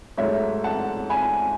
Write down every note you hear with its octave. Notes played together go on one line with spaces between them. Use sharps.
G#2 F#3 A3 C#5 E5
F#5 A5
G#5 B5